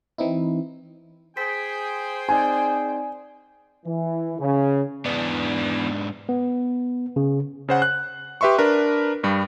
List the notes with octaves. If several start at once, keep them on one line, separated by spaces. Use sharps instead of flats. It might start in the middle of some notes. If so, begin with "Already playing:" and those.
E3 C4 D#4 E4
G#4 C5 G5 B6
C4 D#4 D5 G#5
E3
C#3
G#2 E3 B3 D4
B3
C#3
C#3 C5 F#5
F#6
G4 B4 E5 C6 C#6
D4 A#4 B4
G2 G3